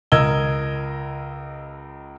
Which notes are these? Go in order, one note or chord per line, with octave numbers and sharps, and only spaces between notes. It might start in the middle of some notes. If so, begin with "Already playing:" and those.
C#2 A#4 D#5 E6 G#6 G7